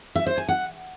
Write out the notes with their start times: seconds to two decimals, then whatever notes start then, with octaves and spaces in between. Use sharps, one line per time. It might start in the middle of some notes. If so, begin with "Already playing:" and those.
0.15 E5
0.27 C5
0.38 G#5
0.49 F#5